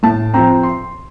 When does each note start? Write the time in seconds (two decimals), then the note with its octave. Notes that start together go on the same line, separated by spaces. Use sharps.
0.03 A2 A5
0.34 F3 C4 A#5
0.63 C6